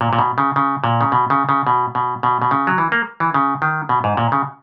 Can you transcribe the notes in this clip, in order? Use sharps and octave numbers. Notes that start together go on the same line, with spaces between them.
A#2
A#2
B2
C#3
C#3
A#2
C#3
B2
C#3
C#3
B2
B2
B2
B2
C#3
F#3
E3
A#3
E3
C#3
D#3
B2
G#2
A#2
C#3